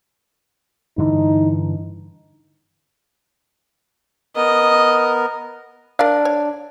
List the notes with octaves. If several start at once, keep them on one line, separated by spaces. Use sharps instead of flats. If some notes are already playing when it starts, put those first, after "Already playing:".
G2 D3 E3 D#4
B3 A#4 D#5
D4 A#4 D5 F5
C#5